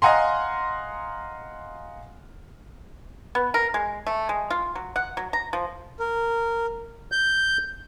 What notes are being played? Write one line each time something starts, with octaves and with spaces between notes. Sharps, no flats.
D#5 F5 F#5 G#5 A#5 C6
B3
A#4
G#3
A3
G#3
F4
F#3
F#5
F#3
A#5
F3
A#4
G6